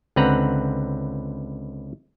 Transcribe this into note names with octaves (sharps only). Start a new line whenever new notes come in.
C#2 D3 C4 B4 F#5 A#5